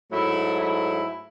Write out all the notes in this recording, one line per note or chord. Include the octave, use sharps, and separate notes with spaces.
G#2 F#3 A3 E4
E4